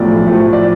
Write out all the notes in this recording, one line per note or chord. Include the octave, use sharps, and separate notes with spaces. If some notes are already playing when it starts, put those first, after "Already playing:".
Already playing: B1 A2 F3 A3 D5
A2 F3 A3
D5